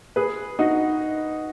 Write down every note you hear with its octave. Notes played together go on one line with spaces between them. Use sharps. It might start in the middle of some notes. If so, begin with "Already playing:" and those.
G#4 B4
D#4 F#4